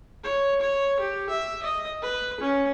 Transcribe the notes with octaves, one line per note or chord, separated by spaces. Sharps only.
C#5
C#5
G4
E5
D#5
B4
C#4